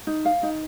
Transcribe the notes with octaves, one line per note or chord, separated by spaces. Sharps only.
D#4
F5
D#4